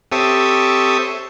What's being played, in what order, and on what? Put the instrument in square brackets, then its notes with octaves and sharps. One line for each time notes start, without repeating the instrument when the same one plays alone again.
[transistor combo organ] C4 G4 A4 C#5 E5 D#6